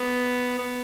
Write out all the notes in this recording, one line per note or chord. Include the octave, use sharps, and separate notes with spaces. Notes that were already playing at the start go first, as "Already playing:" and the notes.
Already playing: B3
B3